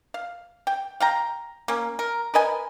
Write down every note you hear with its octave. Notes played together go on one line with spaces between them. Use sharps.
F5
G5
F5 G5 A#5
A#3 C#4
A#4
A#4 B4 D#5 G#5